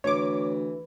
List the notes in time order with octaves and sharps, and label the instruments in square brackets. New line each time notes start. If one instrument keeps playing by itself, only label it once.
[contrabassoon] D2 [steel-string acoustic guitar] E3 [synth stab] C#5 D6